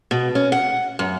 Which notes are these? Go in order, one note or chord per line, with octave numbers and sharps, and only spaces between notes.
B2
C#4
F#5
F#2